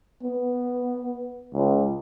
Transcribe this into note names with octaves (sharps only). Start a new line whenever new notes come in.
B3
C#2